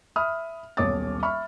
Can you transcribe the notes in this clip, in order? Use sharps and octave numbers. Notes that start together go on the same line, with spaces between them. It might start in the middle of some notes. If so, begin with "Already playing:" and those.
E5 B5 D#6 F6
D#1 B1 C#5 D6 D#6 A6
E5 B5 C#6 F6